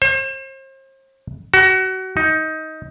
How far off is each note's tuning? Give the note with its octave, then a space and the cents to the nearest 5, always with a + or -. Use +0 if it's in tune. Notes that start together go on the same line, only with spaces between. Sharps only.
C5 +40
F#4 +25
D#4 +15